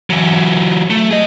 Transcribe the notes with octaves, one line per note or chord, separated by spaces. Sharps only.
E3 F#3
A3
G#4 D#5